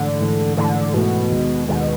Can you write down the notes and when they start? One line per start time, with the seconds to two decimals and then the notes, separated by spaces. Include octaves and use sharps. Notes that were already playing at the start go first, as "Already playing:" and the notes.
Already playing: G#2 D3 E3 A3
0.21 G#2 E3 A3
0.57 G#2 D3 E3 A3
0.94 G#2 B2 E3 A3
1.31 D#2 D#3 G#3
1.68 D#2 B2 D#3 G#3